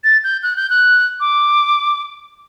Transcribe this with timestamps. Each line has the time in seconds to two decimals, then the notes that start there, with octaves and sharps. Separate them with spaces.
0.04 A6
0.24 G6
0.43 F#6
0.56 G6
0.70 F#6
1.20 D6